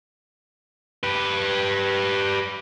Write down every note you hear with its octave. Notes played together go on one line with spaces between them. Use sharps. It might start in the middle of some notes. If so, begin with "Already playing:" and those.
G4 B4